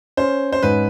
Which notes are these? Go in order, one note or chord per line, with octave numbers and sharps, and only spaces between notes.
C#4 C5
C5
G#2 B4